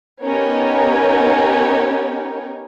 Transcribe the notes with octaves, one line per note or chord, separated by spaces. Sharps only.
B3 C#4 D#4 G4 A#4 C#5